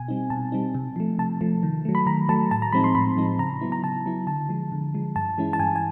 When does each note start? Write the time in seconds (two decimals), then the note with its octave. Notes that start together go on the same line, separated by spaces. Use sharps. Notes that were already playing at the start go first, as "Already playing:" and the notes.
Already playing: B2 G#5
0.08 G3 C4 D#4
0.30 B2 A5
0.52 G3 C4 D#4
0.75 C3
0.96 F3 A3
1.18 C3 A5
1.41 F3 A3
1.63 D#3
1.85 F#3 A3
1.95 B5
2.06 D#3 A#5
2.29 F#3 A3 A5
2.51 A2 A5
2.62 A#5
2.72 F3 G#3 C4 D#4 B5
2.84 C6
2.95 A2 B5
3.17 F3 G#3 C4 D#4
3.39 C#3 A#5
3.61 F#3 B3 E4
3.72 A#5
3.84 C#3 A5
4.06 F#3 B3 E4
4.27 D3 A5
4.49 F3 G#3
4.72 D3
4.94 F3 G#3
5.16 G2 A5
5.38 E3 G#3 C#4 E4
5.53 A5
5.59 G2 G#5
5.76 G#5